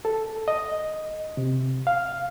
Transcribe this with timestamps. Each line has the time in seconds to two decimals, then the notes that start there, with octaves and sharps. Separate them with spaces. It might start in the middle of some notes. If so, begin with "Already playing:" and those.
0.05 A4
0.48 D#5
1.37 C3
1.87 F5